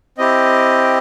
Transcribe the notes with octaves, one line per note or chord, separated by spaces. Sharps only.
C4 E4 G4 D#5